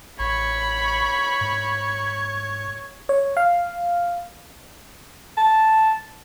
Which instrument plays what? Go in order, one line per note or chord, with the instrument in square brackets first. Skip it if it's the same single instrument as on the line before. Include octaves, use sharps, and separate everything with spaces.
[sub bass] A1 [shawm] C#5 [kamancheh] B5 C#6
[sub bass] G#2
[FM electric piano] C#5
F5
[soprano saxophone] A5